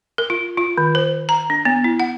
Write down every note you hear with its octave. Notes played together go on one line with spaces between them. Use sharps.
A#4
F4
F4
D#3
C5
A#5
D4
B3
E4
F#5